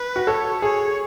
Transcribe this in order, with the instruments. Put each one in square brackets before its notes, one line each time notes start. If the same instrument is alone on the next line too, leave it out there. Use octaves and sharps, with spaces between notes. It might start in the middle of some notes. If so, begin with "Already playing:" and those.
Already playing: [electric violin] B4
[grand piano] F#4
[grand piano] A4 [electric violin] C#5
[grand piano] G#4 [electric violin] C#5